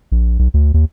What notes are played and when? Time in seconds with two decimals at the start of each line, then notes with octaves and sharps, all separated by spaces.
0.12 A#1
0.39 B1
0.54 D2
0.74 D#2